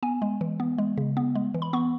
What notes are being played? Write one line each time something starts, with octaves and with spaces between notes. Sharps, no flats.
B3 G#5
G#3
E3
B3
G#3
C#3
B3
G#3
E3
B5
B3 C#6